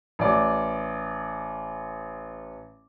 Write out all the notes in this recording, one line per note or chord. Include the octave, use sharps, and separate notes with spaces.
A1 D5